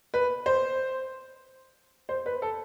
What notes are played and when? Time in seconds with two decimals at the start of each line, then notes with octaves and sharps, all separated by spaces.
0.14 B4
0.46 C5
2.09 C5
2.26 B4
2.42 A4